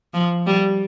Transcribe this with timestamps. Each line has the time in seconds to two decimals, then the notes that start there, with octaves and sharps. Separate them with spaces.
0.14 F3
0.47 G3